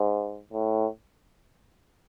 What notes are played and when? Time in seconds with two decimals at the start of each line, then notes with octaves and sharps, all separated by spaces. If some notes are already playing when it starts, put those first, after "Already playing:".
Already playing: G#2
0.53 A2